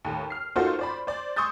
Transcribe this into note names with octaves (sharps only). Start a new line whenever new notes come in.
D#2 A2
F6 C7
A#3 D#4 F4 F#4 A4 C5
C5 D5 B5
C5 D5
C6 C#6 D#6 E6 G6 A6